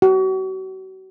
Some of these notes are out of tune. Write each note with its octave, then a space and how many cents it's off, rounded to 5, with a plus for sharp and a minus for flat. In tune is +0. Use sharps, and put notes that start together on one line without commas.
F#4 +40